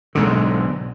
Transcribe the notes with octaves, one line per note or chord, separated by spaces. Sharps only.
B1 G#2 D3